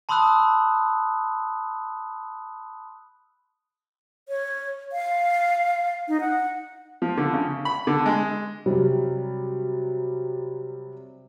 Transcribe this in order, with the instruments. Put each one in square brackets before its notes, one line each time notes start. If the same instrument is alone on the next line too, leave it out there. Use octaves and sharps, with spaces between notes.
[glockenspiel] A5 B5 C6 D#6 E6 F#6
[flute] C#5
F5
D#4
F#5
[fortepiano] F3
D3
C#3
B5
D3
G#3
[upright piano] C3 F#3 G3